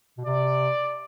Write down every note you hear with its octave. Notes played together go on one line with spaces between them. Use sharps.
B2
C3 D5